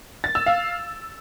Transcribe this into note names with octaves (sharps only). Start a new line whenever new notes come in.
A6
E6
F5